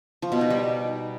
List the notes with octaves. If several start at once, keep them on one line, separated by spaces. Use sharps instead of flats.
F3
B2
D#4
G3